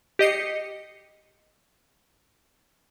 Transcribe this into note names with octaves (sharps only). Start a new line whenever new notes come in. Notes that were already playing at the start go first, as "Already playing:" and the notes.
G4 D#5 C7 C#7